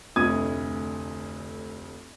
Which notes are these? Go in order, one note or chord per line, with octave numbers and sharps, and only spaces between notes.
F1 D2 D3 D#6 G#6 D#7